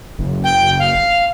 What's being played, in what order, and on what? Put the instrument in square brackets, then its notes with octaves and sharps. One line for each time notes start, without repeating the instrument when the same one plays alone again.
[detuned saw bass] F#1
[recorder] G5
F5